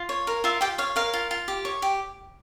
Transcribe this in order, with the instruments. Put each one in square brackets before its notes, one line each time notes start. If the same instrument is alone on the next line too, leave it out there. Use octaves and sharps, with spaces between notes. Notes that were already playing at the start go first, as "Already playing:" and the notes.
Already playing: [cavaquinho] F4
C#5
A#4
F4 E5
F4 G4 G5
C#5 F5
A#4 F5
F4
F4
G4
C#5
G4